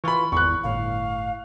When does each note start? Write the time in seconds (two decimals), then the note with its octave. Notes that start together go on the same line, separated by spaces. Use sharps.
0.04 E3 F4 B5 C#6
0.32 G#1 E2 C#6 F#6
0.64 G1 A2 F5